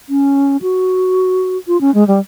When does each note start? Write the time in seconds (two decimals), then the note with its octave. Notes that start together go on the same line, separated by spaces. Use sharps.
0.09 C#4
0.62 F#4
1.68 F4
1.81 C#4
1.94 G#3
2.08 G3